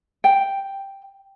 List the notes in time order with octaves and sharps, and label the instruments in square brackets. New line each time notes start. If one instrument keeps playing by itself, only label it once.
[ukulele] G5